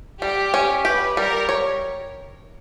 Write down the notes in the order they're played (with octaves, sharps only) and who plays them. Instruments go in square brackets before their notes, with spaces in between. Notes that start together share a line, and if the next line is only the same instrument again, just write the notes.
[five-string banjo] G3 [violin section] G4
[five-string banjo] C#4
[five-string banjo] G4 [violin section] B4
[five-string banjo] G3 [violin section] A#4
[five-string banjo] C#5